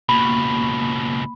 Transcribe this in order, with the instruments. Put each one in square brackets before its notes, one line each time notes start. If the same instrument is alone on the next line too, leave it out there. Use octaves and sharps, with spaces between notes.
[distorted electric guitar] C#2 B2 [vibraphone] A#3 C#6 [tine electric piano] B5